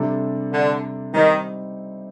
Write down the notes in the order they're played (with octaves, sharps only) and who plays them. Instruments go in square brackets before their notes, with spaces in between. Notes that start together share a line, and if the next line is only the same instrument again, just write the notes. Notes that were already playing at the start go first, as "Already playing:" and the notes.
Already playing: [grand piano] C3 G3 D4 A4
[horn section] D3
[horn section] D#3 [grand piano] G3 C4 D#4